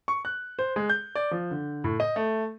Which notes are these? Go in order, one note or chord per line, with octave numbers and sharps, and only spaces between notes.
C#6
F#6
C5
G#3
G6
D5
F3
D3
A2
D#5
A3